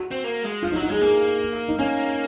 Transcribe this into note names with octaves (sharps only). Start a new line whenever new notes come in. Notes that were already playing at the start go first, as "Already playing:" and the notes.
Already playing: F#4
C4
A#3
G#3
F3 F4
D#4
F#3
D#4
G#3 G#4
A#3 G#4
D#4
A#3 C#4